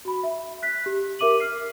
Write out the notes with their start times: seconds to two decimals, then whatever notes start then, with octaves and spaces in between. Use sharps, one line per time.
0.05 F#4 B5
0.23 E5
0.63 F#6 B6
0.86 G4
1.19 G4 A#4 E5 D6 D#7 F#7
1.40 F6 C7